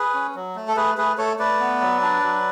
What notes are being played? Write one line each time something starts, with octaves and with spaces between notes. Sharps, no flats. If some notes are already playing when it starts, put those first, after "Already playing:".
Already playing: G#4 B4
C#4
F#3
A3
A4
A3 G#4 B4
A3 G#4 B4
A3 A4 C#5
A3 B4 D5
B3
F#3
D4
F#3